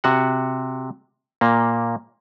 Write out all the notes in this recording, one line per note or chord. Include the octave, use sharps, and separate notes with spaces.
C3 F#4 F#5
A#2 A#3